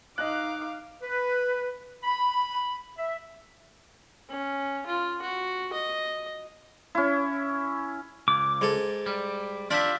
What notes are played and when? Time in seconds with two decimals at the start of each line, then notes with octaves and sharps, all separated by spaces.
0.18 D#4 D#5 F5 D6 F#6
1.02 B4
2.03 B5
2.98 E5
4.29 C#4
4.87 F4
5.22 F#4
5.73 D#5
6.95 C#4 E4
8.28 C#2 D6
8.61 G#2 A4
9.06 G3
9.71 D4 F4 G4 E5 B5